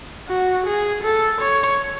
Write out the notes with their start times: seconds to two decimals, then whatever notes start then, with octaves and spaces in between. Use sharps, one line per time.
0.29 F#4
0.66 G#4
1.03 A4
1.41 C#5